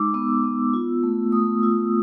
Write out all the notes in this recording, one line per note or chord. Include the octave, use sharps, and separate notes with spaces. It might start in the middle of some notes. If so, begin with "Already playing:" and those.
Already playing: G#3 D#4 D6 E6
B3 E6
B3
F4
A3
A3 D#6
F4 E6